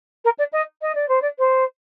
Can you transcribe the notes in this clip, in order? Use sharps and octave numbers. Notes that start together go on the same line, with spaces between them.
A#4
D5
D#5
D#5
D5
C5
D5
C5